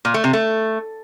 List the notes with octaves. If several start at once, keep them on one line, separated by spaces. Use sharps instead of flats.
A#2
A3
C3
A3